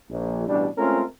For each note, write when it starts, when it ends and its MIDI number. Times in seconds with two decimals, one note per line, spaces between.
0.10 0.48 34
0.48 0.68 33
0.48 0.68 47
0.48 0.68 55
0.48 0.68 62
0.78 1.03 56
0.78 1.03 57
0.78 1.03 60
0.78 1.03 61
0.78 1.03 65
0.78 1.03 70